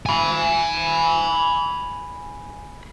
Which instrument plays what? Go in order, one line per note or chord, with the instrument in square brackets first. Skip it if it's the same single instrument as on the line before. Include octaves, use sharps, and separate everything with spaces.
[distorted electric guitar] G#5 B5